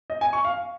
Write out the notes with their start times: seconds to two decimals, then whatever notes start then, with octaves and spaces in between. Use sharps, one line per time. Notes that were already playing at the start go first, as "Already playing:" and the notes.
0.10 D#5
0.21 G#5
0.33 C#6
0.45 F5